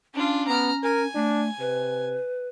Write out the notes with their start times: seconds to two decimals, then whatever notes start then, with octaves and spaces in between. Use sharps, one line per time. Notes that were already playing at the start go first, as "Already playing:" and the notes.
0.14 C#4 D4 F4
0.48 B3 A#5 F6
0.83 A#4 G#5
1.15 A3 D4
1.59 C3 B4